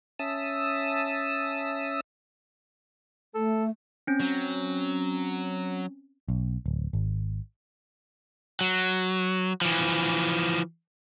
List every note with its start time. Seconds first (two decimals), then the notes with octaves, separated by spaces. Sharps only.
0.19 C#4 E5 A5 D#6 E6
3.35 A3 A4
4.07 C4 C#4
4.20 F#3
6.28 B1
6.66 D1
6.93 G#1
8.61 F#3
9.61 E3 F3